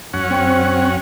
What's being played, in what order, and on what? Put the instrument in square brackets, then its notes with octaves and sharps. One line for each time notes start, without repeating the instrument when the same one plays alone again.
[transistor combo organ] F#2 C#4 F#5
[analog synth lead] C4